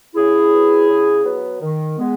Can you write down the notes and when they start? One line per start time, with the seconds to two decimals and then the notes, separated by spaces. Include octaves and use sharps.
0.15 C#3 E4 G#4
0.52 F#3 B3
0.88 C#3
1.25 F#3 B3
1.61 D#3
1.97 G#3 B3